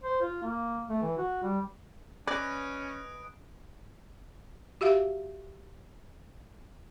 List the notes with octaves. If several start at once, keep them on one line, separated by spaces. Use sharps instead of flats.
C5
F4
A#3
A3
E3
F#4
G3
C#4 B4 D5 D#5 G#5 D#6 F#6 D7
F#4 G4 E5 F5